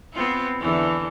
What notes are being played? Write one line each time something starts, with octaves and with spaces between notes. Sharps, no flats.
B3 C4 F4
E2 D3 E3